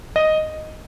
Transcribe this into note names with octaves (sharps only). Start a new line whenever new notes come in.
D#5